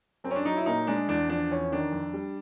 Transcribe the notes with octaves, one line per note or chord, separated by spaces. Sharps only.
F#2 C4
C#4
D4
F#3 D#4
E4
A#2 D#4
G#3 D4
E2 D4
F3 D4
E2 C#4
D#3 D4
F2
G3